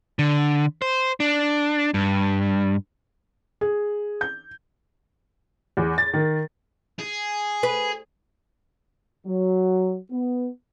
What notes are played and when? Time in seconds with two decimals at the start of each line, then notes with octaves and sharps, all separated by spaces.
0.19 D3
0.82 C5
1.20 D4
1.94 G2
3.61 G#4
4.21 G6
5.77 E2
5.98 A6
6.14 D#3
7.00 G#4
7.63 B4
9.27 F#3
10.11 B3